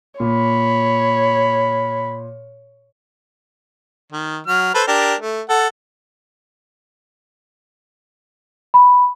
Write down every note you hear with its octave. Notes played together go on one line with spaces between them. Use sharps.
A#2 C#5 B5
D#3
F#3 F6
A4 B4 C5
D4 G4 A#4
A3
A4 F#5
B5